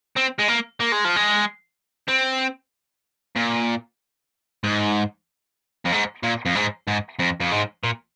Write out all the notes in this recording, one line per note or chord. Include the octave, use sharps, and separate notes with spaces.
C4
G#3
A#3
A#3
G#3
F3
G#3
C4
A#2
G#2
F2
G#2
A#2
F2
G#2
G#2
F2
F2
G#2
A#2